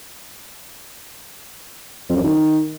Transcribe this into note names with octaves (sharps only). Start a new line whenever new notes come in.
F2
F#2
D#3